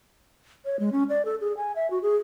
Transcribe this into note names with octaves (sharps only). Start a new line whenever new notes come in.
C#5
G#3
C#4
D5
A4
G#4
G#5
E5
F#4
G#4